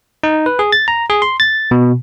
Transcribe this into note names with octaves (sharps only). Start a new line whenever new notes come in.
D#4
B4
G#4
A6
A#5
G#4
C6
A6
B2